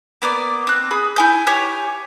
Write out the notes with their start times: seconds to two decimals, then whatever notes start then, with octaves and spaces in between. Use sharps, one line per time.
0.22 A#3 B3 D5 D6
0.67 C4 F#6
0.91 G#4 B5 D#6
1.16 E4 G#5 G6
1.47 G4 C#5 G#5